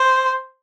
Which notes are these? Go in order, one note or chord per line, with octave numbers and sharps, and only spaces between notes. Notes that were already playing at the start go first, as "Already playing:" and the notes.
Already playing: C5